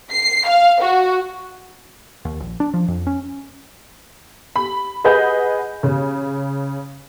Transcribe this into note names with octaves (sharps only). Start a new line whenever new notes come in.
C7
F5
F#4
D#2
A#1
D4
F3
F2
C#4
B5
G#4 B4 D#5 F#5 B5 G6
C#3